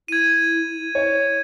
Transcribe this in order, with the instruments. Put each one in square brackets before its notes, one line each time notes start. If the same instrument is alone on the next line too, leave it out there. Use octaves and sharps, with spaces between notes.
[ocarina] E4 [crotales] G#6 D#7
[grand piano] C#5